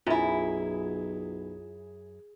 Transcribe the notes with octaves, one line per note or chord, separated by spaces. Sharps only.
B1 F#2 E4 F4 G#4